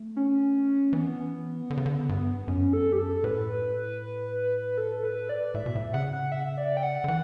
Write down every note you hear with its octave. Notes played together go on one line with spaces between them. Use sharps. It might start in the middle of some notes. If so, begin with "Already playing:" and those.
Already playing: A3
C#4
E3 B3
D3
C#3
D3
G2
F#2 C#4
A4
G4
A4
A2 B4
A4
B4
D5
A2 E5
B2
A2
C#3 F#5
F#5
E5
D5
G5
F#5
D3
E3 F#5